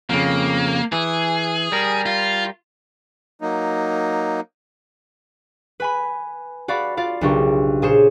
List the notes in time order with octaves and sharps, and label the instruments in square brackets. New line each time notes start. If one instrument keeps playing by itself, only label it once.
[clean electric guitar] F2 C#3 [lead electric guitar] A#3
[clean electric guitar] E3 [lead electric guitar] G#4
[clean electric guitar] G3 A#4
[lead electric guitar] F4
[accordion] F#3 A#3 D#4
[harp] B4 G#5 B5
F#4 D5 F5 B5
F4 D5 F5
B1 C#3 D4 G4 A#4 C#6
A#2 G#4 C5 C#5 E7